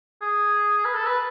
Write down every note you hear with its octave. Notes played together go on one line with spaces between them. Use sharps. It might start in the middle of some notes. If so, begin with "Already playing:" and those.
G#4
B4
A4
B4